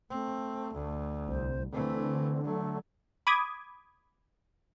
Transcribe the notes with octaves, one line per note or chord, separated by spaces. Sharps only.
A3 C4
D2
C2 C5
D3 E3 A3 C4
F#3 A3
B5 D6 D#6 G#6